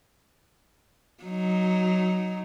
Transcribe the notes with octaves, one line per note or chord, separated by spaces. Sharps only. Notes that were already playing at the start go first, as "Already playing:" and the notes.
F#3 D#4